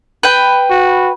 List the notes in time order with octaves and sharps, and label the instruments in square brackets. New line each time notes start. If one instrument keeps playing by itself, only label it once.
[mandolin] B4 G5
[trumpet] F#4